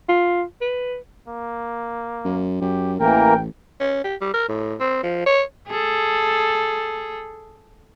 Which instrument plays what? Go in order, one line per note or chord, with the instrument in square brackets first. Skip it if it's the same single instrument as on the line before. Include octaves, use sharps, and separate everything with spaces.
[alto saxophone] F4
B4
[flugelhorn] A#3
[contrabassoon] F#2
[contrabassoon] F#2 [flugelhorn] G4
[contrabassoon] A1 [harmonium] E3 A#3 A#4 [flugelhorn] G5
[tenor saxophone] C#4
G4
G3
A#4
A2
C4
F3
C#5
[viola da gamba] G#4 A4